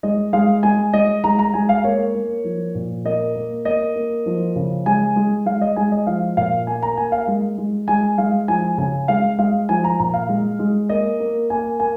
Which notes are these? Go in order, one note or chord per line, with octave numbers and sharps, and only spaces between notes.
G#3 D#5
G#3 F5
G#3 G#5
G#3 D#5
G#3 A#5
A#5
G#3 G#5
F5
A#3 C#5
A#3
F3
A#2
A#3 D#5
A#3
A#3 D#5
A#3
F3
C#3
G#3 G#5
G#3
G#3 F5
D#5
G#3 G#5
D#5
F3 F5
A#2 F5
A#3 G#5
A#5
A#3 G#5
F5
G#3
G#3
G#3 G#5
G#3 F5
F3 G#5
C#3 G#5
G#3 F5
G#3 F5
F3 G#5
A#5
A#2 A#5
F5
G#3
G#3
A#3 D#5
A#3
A#3 G#5
A#3 G#5